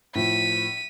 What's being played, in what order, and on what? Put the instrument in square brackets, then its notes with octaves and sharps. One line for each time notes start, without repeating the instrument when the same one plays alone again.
[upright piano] A2 F3 [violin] B6 D#7